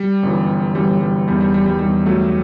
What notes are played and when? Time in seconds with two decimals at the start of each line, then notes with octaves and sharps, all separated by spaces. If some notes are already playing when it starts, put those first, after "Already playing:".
Already playing: G3
0.23 G1 F#2 E3
0.75 G1 F#2 E3 G3
1.01 G3
1.27 E2 D#3 G3
1.40 G3
1.54 G3
1.66 G3
1.79 E2 D#3 G3
2.06 F#3 A3